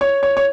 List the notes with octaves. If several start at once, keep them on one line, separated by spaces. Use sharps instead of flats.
C#5
C#5
C#5